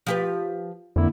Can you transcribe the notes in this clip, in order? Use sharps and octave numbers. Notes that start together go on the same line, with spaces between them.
F3 G4 B4
F2 D3 A#3 E4